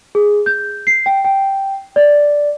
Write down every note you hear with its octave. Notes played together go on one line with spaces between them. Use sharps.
G#4
G6
C7
G5
G5
D5